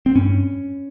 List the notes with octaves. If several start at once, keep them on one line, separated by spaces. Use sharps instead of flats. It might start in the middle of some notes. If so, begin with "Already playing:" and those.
C4
G2 C#4